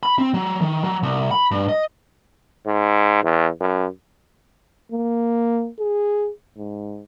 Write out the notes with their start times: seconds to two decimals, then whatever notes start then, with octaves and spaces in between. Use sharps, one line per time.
0.03 B5
0.19 C4
0.34 F#3
0.61 D#3
0.84 F#3
1.03 C2
1.31 B5
1.51 G2
1.69 D#5
2.66 G#2
3.24 E2
3.60 F#2
4.92 A#3
5.79 G#4
6.57 G#2